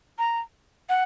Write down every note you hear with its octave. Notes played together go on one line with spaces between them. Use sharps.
A#5
F#5